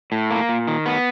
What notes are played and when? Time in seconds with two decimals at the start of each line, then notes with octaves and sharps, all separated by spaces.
0.12 A2
0.31 A#3
0.49 A#2
0.67 D#3
0.86 B3